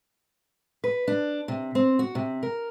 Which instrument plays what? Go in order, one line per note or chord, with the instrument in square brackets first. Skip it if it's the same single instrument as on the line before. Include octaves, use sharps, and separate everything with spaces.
[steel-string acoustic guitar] B4
D4
C3
C4
F#4
C3
A#4